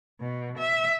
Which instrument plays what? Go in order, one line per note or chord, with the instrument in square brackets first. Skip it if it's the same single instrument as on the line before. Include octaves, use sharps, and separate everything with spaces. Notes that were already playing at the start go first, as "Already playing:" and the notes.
[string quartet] B2
E5